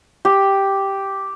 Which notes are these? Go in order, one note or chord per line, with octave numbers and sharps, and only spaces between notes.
G4